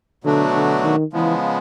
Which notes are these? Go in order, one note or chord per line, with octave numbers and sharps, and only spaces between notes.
B2 D3 F#3 A3 D4 F#4
D3
D#3
C#3 E3 F3 G#3 B3